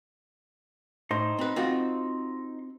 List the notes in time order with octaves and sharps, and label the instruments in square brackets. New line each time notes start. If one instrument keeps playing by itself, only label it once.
[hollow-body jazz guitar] A2 [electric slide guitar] D#4 C5
[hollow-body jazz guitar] C4 B4
C4 F4 F#4